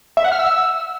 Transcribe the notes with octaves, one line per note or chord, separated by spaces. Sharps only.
E5
F#5
F6
E6